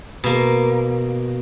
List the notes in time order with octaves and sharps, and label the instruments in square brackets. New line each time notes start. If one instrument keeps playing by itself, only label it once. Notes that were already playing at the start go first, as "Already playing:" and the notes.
[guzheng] B2 A#3